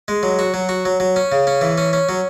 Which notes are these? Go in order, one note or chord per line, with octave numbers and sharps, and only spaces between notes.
G#3
F#3
F#4
F#3
F#4
F#3
F#3
C#4
C#3
C#4
E3
C#4
C#4
F#3